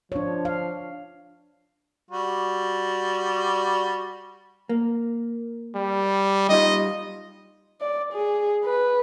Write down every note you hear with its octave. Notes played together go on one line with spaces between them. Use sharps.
F3 D4 C#5
F5
G3 F#4
A#3
G3
G3 D#4 F4 D#5
D5
G#4
B4